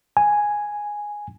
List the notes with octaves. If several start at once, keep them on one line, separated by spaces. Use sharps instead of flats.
G#5